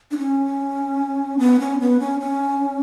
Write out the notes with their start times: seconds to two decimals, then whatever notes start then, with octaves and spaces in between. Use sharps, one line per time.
0.11 D4
0.18 C#4
1.39 B3
1.60 C#4
1.80 B3
2.00 C#4
2.20 C#4